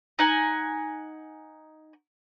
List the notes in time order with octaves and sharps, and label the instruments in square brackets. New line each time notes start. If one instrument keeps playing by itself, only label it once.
[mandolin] D#4 F#5 G#5